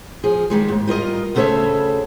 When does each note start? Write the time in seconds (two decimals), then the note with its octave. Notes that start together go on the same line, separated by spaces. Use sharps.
0.24 F3 G#4
0.50 D#3 G3 G#3
0.68 D#2 G#2
0.87 G3 F4 A#4 D#5
1.35 D2 C#3 A4 C5 C#5 E5